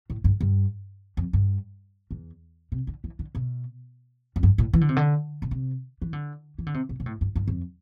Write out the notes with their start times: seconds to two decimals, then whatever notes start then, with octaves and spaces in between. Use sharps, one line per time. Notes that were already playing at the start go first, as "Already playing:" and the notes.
0.10 A2
0.24 G2
0.41 G2
1.17 F2
1.33 G2
2.11 E2
2.72 C3
2.87 D3
3.04 E3
3.19 D3
3.35 B2
4.36 F2
4.43 G2
4.58 A2
4.73 E3
4.81 D3
4.89 C3
4.96 D3
5.42 B2
5.51 C3
6.02 E3
6.13 D3
6.58 E3
6.66 D3
6.74 C3
6.89 B2
7.00 B2
7.06 A2
7.21 G2
7.36 G2
7.48 F2